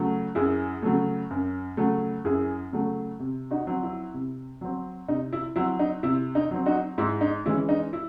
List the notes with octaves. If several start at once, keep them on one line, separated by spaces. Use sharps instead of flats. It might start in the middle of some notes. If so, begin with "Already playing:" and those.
Already playing: C#3 F#3 A3
F#2 E4 G#4
C#3 F#3 A3
F#2
C#3 F#3 A3
F#2 E4 G#4
C#3 F#3 A3
C3
D#4 F#4
F#3 C4
E4
C3
F#3 C4
C3 D#4
E4
F#3 C4 E4
D#4
C3 E4
D#4
F#3 C4
D#4 F#4
G#2 E4
D#4
E3 G#3 C#4 E4
D#4
E4